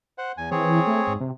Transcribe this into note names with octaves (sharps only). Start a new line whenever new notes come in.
C5 F#5
E2 G#5
E3 C4 G#4 C#5
A3
G#2
C3